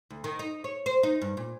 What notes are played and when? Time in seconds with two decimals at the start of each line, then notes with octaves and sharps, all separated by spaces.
0.10 D2
0.24 D#3
0.39 D#4
0.64 C#5
0.86 C5
1.03 D#4
1.21 G2
1.37 A#2